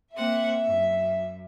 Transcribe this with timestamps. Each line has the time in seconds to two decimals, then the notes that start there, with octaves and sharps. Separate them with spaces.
0.15 A#3 C4 E5 F#5
0.65 F#2